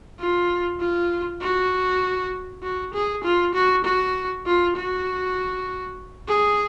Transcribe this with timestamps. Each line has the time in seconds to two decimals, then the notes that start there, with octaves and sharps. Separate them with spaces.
0.20 F4
0.80 F4
1.41 F#4
2.63 F#4
2.94 G#4
3.24 F4
3.54 F#4
3.84 F#4
4.46 F4
4.76 F#4
6.28 G#4